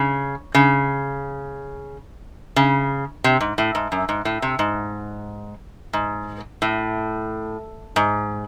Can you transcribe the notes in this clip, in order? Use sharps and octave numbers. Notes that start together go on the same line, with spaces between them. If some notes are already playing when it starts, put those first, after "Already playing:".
Already playing: C#3
C#3
C#3
C3
G#2
A2
G#2
F#2
G#2
A2
C3
G#2
G#2
A2
G#2